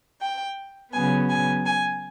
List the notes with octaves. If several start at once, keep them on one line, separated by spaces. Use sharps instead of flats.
G5
C#3 F#3 B3 G#5
G#5
G#5